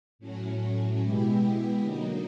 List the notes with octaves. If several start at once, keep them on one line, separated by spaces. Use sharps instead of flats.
A2 F#3 A3 C#4
B2 G#3 B3 E4 G4
D3 F#3 A#3 D#4